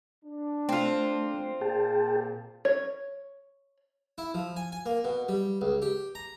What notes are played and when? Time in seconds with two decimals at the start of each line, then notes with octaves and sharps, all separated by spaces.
0.25 D4
0.69 A3 C4 F4
1.61 A#2 G#4 G5 A5
2.65 C#5
4.18 E4
4.34 F3
4.57 G#5
4.72 G#5
4.86 A#3
5.04 B2
5.29 G3
5.61 C#2
5.82 G4
6.15 A#5